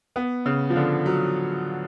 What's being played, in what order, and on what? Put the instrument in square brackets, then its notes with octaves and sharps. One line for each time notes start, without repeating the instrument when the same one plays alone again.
[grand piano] B3
C#3
F3
D3
F#3